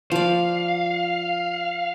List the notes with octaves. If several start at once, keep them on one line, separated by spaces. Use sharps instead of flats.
F3 D5 F5